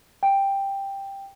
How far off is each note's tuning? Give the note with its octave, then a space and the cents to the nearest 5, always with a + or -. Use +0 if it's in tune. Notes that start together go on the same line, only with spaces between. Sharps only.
G5 +5